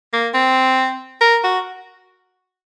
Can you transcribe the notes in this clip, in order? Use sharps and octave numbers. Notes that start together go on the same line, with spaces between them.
A#3
C4
A#4
F#4